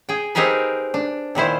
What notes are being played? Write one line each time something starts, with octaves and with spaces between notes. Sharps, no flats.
G#4 G5
C4 D#4 G4 G#4 A#4 B4
D4
A#2 D#3 E4 C5